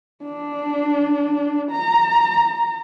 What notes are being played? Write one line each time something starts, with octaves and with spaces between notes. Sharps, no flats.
D4
A#5